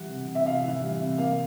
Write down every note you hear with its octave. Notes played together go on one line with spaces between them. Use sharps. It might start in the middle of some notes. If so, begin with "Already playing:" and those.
Already playing: E3 G3 F#5
C3
C3
E5
C3 F5
E3
G3
C3
A#3 F5